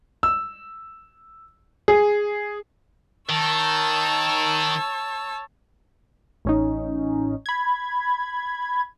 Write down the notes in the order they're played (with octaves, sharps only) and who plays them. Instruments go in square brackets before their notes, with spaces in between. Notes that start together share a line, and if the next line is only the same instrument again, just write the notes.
[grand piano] E6
G#4
[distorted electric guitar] D#3 [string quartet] C#5 A5 E6
[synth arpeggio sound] A1 C#4 D#4
B5 G#6